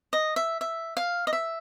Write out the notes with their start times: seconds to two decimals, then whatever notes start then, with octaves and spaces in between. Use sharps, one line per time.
0.13 D#5
0.36 E5
0.61 E5
0.97 F5
1.27 D#5
1.33 E5